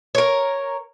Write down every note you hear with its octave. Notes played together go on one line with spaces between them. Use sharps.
A#4 C#5